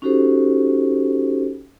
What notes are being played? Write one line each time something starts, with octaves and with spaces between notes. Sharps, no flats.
C#4 D#4 F#4 G4 A4 C5